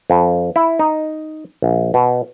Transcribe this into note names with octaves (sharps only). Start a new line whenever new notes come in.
F2
E4
D#4
A#1
B2